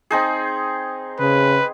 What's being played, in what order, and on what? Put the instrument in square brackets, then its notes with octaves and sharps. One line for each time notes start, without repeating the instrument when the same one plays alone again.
[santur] C4 D#4 G#4
[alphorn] C#3 [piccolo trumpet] B4